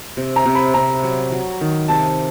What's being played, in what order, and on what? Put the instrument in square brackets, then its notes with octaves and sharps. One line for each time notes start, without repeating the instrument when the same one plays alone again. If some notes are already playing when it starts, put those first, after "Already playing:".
[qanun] C3
[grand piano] A#5
[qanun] C3
[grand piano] B5
[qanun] C3 [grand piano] A#5
[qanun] F#3
F#3
D#3
[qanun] C3 [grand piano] A5